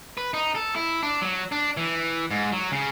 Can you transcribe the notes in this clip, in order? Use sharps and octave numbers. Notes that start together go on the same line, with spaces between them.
B4
D#4
A4
E4
D4
F#3
D4
E3
G#2
F#3
C#3